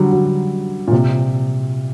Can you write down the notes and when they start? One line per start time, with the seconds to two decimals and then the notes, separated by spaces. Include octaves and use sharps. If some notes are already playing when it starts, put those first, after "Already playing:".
Already playing: D3 F#3 G3
0.12 F#3
0.88 A#2
0.92 C3